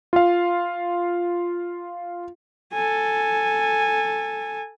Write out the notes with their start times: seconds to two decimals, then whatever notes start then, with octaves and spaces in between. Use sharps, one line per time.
0.13 F4 F5
2.73 A4 G#5